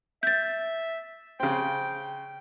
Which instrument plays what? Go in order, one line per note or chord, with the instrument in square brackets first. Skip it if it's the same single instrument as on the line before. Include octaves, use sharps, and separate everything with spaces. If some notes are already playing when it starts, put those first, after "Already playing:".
[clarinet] E5 [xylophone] G6 A6
[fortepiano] C#3 C4 [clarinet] G5